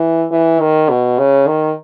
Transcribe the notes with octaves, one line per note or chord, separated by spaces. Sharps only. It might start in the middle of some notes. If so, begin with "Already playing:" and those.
Already playing: E3
E3
D#3
B2
C#3
D#3